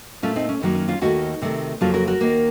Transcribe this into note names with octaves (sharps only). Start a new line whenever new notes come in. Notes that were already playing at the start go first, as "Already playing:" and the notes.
A#2 A3 C#4 F4
C4 D#4
C#4
F#2 D#3 F#3 A#3
C#4
C#4 F4
D#2 D#3 A3 D#4 F#4
C3 D#3 A3
F2 C#3 F#3 A#3 F4 A4
F#4 A#4
F#4 A#4
D#2 D#3 A#3